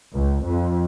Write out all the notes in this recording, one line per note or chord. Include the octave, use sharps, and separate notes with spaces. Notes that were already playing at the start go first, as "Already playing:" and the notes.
C#2
F2